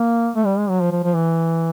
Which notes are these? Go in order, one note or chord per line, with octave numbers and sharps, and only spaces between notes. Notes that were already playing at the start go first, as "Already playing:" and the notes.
Already playing: A#3
A3
G3
G#3
F#3
F3
F3
F3
E3